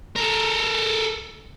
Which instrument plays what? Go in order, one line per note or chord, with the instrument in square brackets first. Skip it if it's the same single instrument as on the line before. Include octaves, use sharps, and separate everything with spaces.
[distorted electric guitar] A4 A#4